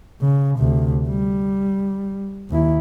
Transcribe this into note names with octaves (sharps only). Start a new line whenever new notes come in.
C#3
D2 C3
G3
D#2 E4